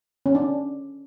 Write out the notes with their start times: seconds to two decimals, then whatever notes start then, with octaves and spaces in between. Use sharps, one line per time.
0.26 C#4
0.35 D4